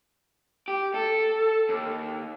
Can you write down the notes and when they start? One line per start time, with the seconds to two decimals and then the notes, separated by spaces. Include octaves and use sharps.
0.68 G4
0.94 A4
1.69 D#2